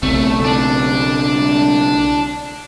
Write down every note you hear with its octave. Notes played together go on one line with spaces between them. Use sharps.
B1 C#3 A3 C4
D4